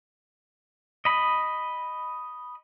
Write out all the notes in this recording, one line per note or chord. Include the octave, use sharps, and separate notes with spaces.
D#5 B5